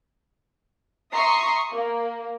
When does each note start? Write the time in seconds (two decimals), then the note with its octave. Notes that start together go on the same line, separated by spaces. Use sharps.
1.13 E5 A#5 C6 C#6 D#6 C7
1.72 A#3